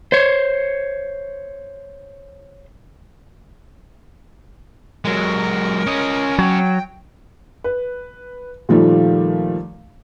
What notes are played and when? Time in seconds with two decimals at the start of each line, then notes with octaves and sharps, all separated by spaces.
0.12 C5 C#5
5.05 F#3 G#3 A#4
5.86 C#4 D#5
6.38 F#3 G5
7.64 B4
8.69 A#2 D#3 F3 G3 A3